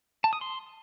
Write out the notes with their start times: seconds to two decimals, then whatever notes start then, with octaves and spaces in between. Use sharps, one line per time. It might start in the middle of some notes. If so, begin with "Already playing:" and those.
0.24 A5
0.33 D#6
0.41 C6